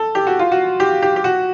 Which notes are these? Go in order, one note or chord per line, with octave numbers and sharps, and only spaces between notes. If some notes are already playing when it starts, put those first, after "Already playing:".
Already playing: A4
G4
F#4
F4
F#4
G4
G4
G4
F#4